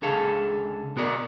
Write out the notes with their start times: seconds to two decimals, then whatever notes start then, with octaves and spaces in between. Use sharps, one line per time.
0.02 C#2 D3 G#4 A4 F5
0.96 B2 B3 F#4 A#4 D5